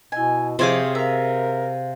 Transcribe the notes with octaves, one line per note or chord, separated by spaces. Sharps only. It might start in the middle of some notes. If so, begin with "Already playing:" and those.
B2 E4 D#5 G#5
C3 F3 G#4 C5 C#5 F5 D6
A#4 C5 E5 F5